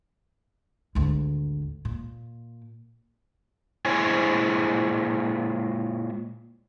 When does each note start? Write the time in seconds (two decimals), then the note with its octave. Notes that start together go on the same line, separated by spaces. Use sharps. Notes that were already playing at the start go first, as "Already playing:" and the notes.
0.95 G#1 D2
1.85 A#2
3.85 A#2 G#3 E4 C5 C#5 G#5